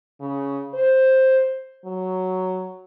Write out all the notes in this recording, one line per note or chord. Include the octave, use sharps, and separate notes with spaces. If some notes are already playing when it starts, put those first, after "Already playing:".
C#3
C5
F#3